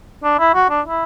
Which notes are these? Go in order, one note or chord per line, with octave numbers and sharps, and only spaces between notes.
D4
E4
F#4
D4
E4